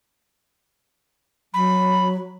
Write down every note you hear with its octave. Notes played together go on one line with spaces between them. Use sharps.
F#3 B5